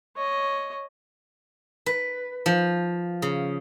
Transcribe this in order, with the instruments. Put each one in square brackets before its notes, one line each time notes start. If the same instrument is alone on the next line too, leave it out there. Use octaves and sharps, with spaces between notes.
[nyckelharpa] C#5 D#5
[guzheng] B4
F3
C#3